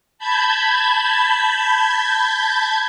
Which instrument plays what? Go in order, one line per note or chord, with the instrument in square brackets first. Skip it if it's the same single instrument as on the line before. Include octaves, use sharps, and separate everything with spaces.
[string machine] A5 B5 G6 G#6